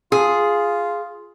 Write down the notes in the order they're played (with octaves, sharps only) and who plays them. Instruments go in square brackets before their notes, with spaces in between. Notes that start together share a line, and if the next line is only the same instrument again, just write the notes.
[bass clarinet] F4 [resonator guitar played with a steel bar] G#4